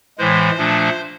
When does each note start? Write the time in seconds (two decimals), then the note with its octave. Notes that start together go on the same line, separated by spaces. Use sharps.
0.18 A2 E3 G#3 C5
0.58 A#2 F3 A3 D4